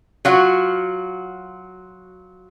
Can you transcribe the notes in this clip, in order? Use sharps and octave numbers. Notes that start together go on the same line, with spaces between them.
F#3 F4 F#4